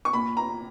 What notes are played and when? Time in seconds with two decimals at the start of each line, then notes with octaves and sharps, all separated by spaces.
0.05 C#6
0.13 A#2 B5
0.37 A#5